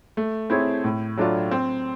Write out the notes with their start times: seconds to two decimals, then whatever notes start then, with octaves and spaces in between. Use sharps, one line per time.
0.17 A3
0.50 C4 E4 G#4 C#5
0.84 A2
1.17 F#3 A3 D4 F4
1.51 C4